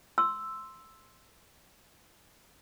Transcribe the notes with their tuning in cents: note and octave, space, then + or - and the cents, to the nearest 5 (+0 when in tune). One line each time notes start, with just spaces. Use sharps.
C6 +0 E6 +0